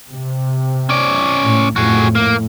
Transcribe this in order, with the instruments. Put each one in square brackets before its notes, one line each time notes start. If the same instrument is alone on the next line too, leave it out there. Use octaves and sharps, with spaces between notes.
[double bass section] C3
[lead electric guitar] C#4 D5
[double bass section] A2
[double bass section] F2 A2 [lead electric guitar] F#4 G#4
[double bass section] A2 [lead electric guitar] A#3